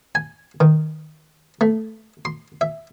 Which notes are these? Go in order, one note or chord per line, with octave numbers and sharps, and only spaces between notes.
G#5
D#3
A3
C6
E5